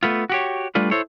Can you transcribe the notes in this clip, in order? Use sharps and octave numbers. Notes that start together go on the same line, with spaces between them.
A3 B3 F4
F#4 G4 C#5
G3 A3 D4 F4 B4
E4 A4 C5 C#5